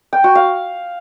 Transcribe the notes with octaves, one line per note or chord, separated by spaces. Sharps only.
G5
F#4
F5